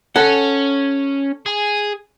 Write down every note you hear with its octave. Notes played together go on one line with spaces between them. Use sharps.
C#4 A4 F#5
G#4